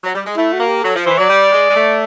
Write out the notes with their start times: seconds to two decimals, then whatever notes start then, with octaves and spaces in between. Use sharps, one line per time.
0.03 F#3
0.15 G3
0.26 G#3
0.37 A3 E4
0.53 F#4
0.60 A#3
0.67 G4
0.83 F#3 A4
0.95 F3
1.06 E3 C5
1.18 F#3 D5
1.29 G3
1.52 G#3
1.69 G#3
1.75 A3